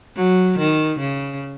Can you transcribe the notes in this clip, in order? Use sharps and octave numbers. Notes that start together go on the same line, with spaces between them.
F#3
D#3
C#3